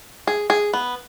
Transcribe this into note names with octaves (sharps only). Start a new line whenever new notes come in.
G#4
G#4
B3